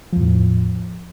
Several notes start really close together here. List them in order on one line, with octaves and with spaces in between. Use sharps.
F3 E2 A2